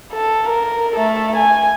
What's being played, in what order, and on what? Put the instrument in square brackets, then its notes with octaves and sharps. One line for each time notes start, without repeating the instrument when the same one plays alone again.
[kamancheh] A4
A#4
A3 A4
G#5